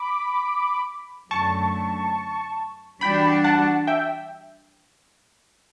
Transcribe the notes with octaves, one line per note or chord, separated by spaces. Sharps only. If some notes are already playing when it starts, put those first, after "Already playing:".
Already playing: B5 D6
F#2 D3 F#3 A3 A5 C#6
E3 G3 D4 F#4 G5 B5
F#5 A5
E5 G5